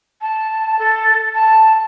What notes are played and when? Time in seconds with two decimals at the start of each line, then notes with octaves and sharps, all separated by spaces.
0.22 A5
0.79 A4
1.35 A5